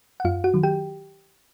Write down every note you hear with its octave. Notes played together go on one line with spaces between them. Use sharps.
F#5
F#2 F4 F5
F#4 F#5
D#3 F#3
G4 G5